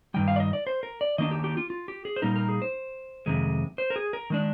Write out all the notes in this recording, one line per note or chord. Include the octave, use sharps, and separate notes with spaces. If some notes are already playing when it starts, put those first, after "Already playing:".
G2 D#3 G3 G5
F5
D5
D#5
D5
C5
A#4
D5
D#3 A#3 D4 D#5
G4
G4
F4
F4
G4
G#4
C5
A#2 G3 A#3 D#4 A#4
A#4
G#4
C5
F2 C3 D#3 G#3
C5
A#4
G#4
A#4
D#3 G#3 D4